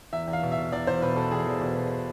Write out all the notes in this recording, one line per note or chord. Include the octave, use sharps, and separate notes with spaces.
E2 E5
E2
F5
B2
E5
B2
E2 D5
E2 C5
B2 B4
B2 A4
E2 G#4
E2
B2
B2